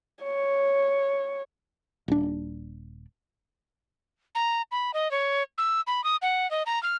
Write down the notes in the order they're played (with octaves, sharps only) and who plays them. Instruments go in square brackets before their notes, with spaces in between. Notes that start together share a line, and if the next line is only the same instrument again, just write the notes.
[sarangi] C#5
[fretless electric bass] D#1 D4
[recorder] A#5
B5
D#5
C#5
E6
B5
D#6
F#5
D#5
A#5
F6